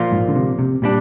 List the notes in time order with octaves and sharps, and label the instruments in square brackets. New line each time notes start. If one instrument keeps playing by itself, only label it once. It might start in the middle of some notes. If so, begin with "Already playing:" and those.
Already playing: [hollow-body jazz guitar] A#2 F3 A#3 F4
[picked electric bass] G#2
D3
C3
C3
[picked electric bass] A#2 [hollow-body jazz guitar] G3 D4